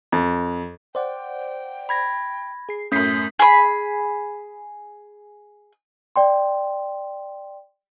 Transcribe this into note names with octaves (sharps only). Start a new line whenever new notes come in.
F2
C5 D5 F#5 G5
B5 G#6 A#6
G#4 C7
F#2 A2 C#4 D#6 G6 B6 C7
G#4 B5
D5 G5 C6